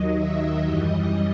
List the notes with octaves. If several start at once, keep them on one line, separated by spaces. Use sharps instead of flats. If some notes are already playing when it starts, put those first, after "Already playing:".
Already playing: D#2 D#3 F#3 D#5
E5
F#2 E3 G3 D#5